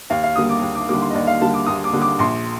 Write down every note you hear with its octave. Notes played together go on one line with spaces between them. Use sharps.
D#2 F5
F5
D3 G3 A#3 D#6
D6
D#2
D6
D3 G3 A#3 D6
C6
D#5
D#2 D5
F5
D3 G3 A#3 A5
D6
D#2 D#6
D6
D3 G3 A#3
D6
A#1 C6